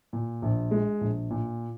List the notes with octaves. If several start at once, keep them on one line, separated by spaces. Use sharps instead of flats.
A#2
A#1
G#3
A#1
A#2